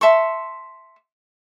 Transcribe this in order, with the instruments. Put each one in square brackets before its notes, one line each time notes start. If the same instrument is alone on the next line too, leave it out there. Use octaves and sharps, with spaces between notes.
[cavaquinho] E5 A5 C6 C#6